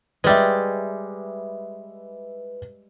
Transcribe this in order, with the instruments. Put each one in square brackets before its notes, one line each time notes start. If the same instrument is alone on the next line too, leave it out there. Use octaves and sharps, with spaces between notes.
[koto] G3 G#3 [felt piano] B4 E5